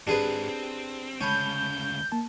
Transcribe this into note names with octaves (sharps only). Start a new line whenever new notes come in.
G#2 C4 D4 G4 G#4 B4
C4
D2 C#3 G#3 C#4 A5 B5 G6
A#3 A5